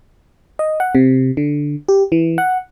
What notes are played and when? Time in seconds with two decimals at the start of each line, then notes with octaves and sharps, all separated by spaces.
0.59 D#5
0.80 F#5
0.95 C3
1.37 D3
1.88 G4
2.12 E3
2.38 F#5